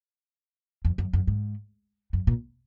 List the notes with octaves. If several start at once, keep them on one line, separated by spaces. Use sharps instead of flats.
F2
F#2
F#2
G#2
F#2
A#2